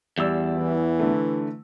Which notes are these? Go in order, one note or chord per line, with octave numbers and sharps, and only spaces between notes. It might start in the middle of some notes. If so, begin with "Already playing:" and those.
E2 G3 D5 E6
E3
D3 A3